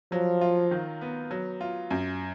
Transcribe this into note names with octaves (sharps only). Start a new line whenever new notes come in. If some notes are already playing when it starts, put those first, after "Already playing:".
F3 F#3
F4
D#3
B3
F#3
F4
F#2